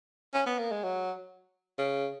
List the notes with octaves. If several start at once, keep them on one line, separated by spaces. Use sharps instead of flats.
C#4
B3
A#3
G#3
F#3
C#3